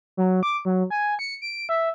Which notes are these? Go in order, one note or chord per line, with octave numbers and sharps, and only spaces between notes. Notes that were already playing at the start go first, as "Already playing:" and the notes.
F#3
D6
F#3
G#5
C#7
D7
E5